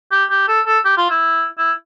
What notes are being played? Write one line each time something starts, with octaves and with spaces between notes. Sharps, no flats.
G4
G4
A4
A4
G4
F4
E4
E4